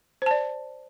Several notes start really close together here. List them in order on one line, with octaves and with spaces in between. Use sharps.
C5 A5 D5